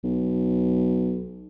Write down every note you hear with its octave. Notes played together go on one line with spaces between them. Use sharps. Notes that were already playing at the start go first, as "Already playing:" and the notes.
B1